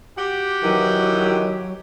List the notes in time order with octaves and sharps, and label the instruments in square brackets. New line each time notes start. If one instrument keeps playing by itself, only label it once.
[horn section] F#4 G4
[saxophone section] D#3 E3 [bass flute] F#3